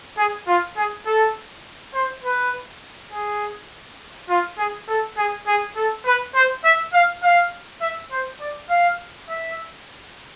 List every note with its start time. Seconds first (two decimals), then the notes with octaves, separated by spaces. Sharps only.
0.18 G#4
0.48 F4
0.77 G#4
1.06 A4
1.94 C5
2.24 B4
3.12 G#4
4.29 F4
4.58 G#4
4.88 A4
5.17 G#4
5.47 G#4
5.76 A4
6.06 B4
6.35 C5
6.65 E5
6.94 F5
7.23 F5
7.82 E5
8.11 C5
8.40 D5
8.70 F5
9.29 E5